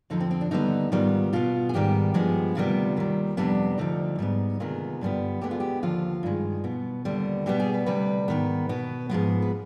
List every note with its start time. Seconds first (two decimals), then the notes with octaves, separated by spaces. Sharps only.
0.10 F2 D3 F3 D#4
0.20 C4
0.31 C4
0.41 D4
0.51 D#2 D3 G3 B3 D#4
0.92 G#2 D#3 G3 B3 F4
1.33 B2 B3 F4
1.69 G#4
1.74 G#2 D#3 G3 B3 G4
2.14 G2 F3 G#3 B3
2.55 D2 C3 D#3 G3 B3 F4
2.97 D#2 D#3 G3
3.37 F2 C3 G3 B3 D4
3.78 D2 D3 F3 D#4
4.19 G#2 G3 B3
4.60 D2 C3 D#3 G#3 B3 F4
5.01 G2 D3 G3 B3
5.41 D2 D3 G#3 B3 G4
5.51 F4
5.60 G4
5.83 D#2 D3 F3 F4
6.23 G2 D#3 G#3
6.64 B2 B3
7.05 D#2 D3 G3 B3
7.46 B2 G3 B3 G4
7.60 G#4
7.74 B4
7.86 D2 C3 G3 B4
8.28 G#2 D#3 B3
8.69 B2 B3
9.09 G#2 F3 G#3 B3
9.42 B4